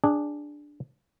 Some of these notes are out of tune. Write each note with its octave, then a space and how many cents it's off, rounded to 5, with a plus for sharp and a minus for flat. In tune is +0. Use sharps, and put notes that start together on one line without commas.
D4 +0 G#4 -15